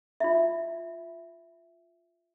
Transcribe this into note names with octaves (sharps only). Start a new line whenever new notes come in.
F4 E5